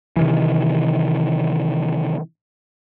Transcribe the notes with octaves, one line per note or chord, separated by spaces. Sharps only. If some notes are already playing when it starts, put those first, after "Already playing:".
C3 D#3 E3